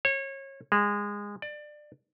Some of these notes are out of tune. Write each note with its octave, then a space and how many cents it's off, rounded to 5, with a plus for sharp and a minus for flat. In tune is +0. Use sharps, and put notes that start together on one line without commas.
C#5 -30
G#3 -20
D5 +25